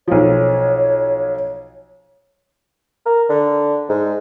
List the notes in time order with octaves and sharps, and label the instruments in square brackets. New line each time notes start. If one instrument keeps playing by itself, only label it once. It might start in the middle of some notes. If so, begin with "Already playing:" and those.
[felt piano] B1 F3 [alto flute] C#5
[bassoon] A#4
D3
G#2